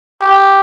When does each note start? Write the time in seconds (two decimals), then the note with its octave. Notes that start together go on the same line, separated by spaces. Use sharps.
0.21 G4